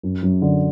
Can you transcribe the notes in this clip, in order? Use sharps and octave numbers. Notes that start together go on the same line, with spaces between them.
F#2
F#2
D3